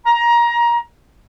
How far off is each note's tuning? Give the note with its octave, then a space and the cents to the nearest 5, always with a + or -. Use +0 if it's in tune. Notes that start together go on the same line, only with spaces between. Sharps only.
A#5 +20